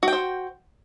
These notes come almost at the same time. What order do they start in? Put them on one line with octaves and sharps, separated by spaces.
F#4 G5 C5